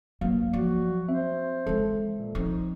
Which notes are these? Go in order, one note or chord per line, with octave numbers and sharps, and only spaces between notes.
G2 F#3 A#3 F5
F3 F#4 D5
C4 C5 E5
E3 G#3 A4
A#2
F3 C4 D#4